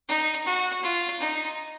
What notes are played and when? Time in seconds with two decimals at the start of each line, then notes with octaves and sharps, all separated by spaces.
0.08 D#4
0.45 F#4
0.83 F4
1.20 D#4